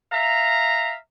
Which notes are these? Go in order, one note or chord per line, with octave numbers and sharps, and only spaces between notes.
E5 F5 A#5